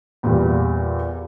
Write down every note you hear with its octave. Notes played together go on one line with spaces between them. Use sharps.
E2 A#2 G3